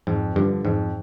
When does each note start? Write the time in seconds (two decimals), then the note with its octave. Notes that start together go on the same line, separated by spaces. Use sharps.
0.07 F2 G#2
0.36 G2 D3 F3
0.65 F2 G#2